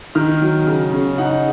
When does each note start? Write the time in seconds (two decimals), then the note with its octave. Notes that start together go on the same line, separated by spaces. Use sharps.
0.15 D#3 F6
0.41 F#3
0.67 C#3
0.93 C#3
1.18 D#4 F#5